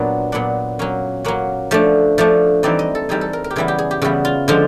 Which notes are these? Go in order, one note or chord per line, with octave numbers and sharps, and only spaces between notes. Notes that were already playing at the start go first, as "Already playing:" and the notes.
Already playing: A#2 F#3 B3 D4
A#2 F#3 B3 D4 F#5
F#3 A#3 C#4
F#3 A#3 C#4 F#5
F3 A3 D4
F3 A3 D4
E3 G3 C4 D#4 D5
D#5
A4
E3 G3 C4 D#4 G#4
A4
A#4
A#4
G4
C#3 E3 G3 B3 E4 G#4
G4
G#4
G4
C#3 E3 G3 B3 E4 F#4
F4
D3 F3 G#3 F4